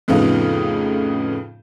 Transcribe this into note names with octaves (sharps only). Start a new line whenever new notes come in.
F2 A2 C#3 B3 D#4 F4